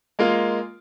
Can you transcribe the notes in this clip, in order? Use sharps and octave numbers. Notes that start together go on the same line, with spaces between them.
G#3 A#3 F4